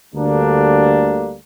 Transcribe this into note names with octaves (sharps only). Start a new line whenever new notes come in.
D2 D3 G3 A#3 D4